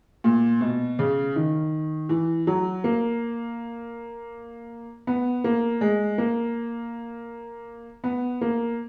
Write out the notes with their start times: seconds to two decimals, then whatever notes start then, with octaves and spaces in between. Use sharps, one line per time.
0.24 A#2
0.61 B2
0.99 C#3
1.36 D#3
2.09 E3
2.47 F#3
2.84 A#3
5.07 B3
5.44 A#3
5.81 G#3
6.18 A#3
8.04 B3
8.41 A#3